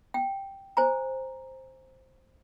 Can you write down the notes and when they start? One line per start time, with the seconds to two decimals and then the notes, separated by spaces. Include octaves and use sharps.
0.14 G5
0.77 C5 G#5 A#5